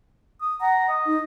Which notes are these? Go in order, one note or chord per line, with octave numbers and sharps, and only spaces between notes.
D#6
F#5 A#5
D#5
D#4